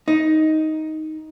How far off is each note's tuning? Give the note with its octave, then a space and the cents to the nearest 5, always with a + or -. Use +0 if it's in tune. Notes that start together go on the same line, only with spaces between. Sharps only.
D#4 +10